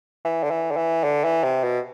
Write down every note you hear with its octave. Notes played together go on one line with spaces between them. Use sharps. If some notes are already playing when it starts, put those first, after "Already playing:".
E3
D3
E3
D3
E3
D3
E3
C3
B2